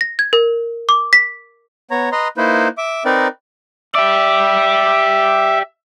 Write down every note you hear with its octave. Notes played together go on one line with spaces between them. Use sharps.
A#6
G#6
A#4
D6
B6
B3 C#5 A#5
B4 D#5 A#5 C6
A#3 D#4 E4 B4 C5
E5 D6
C4 D#4 A#4 B4 D5
G4 D5 E5